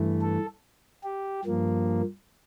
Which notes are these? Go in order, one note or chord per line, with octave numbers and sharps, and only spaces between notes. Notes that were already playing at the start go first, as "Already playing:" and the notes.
Already playing: G2 E3 A3
A4
G4
G2 F3 A#3